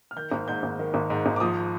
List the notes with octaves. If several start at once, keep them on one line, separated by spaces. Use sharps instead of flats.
F6
D#3 G6
G#1
G#2 G6
G#1
D#3
G#1
G#2
G#1
D6
F3 D#6